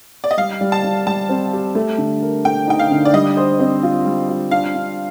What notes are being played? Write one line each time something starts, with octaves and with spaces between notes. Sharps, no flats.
D5
D#5
G3 F5
G3
A5
G3
G3 A5
C4
G4
A3
D3
A#4
A3 G5
D#4 G5
F5
D3
D5
G3 D#5
C5
C4
F4
G3
F4
D4 F5
D4